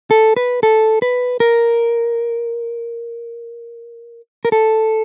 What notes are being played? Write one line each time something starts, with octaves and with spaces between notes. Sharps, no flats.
A4
B4
A4
B4
A#4
A#4
A4